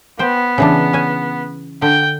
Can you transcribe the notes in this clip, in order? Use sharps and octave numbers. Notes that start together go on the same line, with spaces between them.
B3 C5 G5
C#3 E3 D4
C#4 G#5
D3 G5